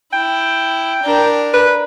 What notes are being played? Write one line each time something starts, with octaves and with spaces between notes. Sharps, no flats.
E4 G5
D4 A#4
B4